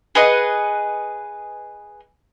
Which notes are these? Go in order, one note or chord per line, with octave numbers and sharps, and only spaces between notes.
G#4 B4 D#5 F#5